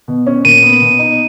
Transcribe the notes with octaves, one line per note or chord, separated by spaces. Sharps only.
B2
C#4
A#2 D#7
B3
B2
D#4